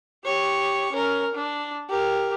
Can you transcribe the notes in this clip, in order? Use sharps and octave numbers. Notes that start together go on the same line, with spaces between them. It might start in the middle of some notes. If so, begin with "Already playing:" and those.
G4 C#5
C#4 A#4
D4
G4 A#4